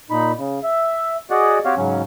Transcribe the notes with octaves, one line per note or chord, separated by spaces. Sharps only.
A#2 D#4 B5
C#3
E5
F#4 G#4 D5 D#5 F#5
C4 F#4 G4 C#5 F5
G#2 C#3 F#3 C#4